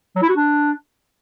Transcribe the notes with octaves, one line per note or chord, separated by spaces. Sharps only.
F#3
E4
F#4
D4